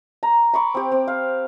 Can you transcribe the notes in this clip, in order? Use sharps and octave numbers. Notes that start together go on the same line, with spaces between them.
A#5
B5 C#6 D6
C4 G4
C4
F5